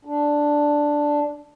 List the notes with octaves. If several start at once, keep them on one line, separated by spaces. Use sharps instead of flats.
D4